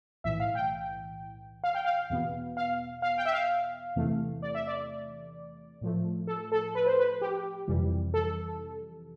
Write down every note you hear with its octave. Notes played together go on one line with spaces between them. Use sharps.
B1 A2 E3 E5
F5
G5
F5
G5
F5
E2 B2 B3
F5
F5
G5
E5
F5
E2 C3 E3 A3
D5
E5
D5
A2 F3 A3
A4
A4
B4
C5
B4
G4
F2 C3 E3 G3
A4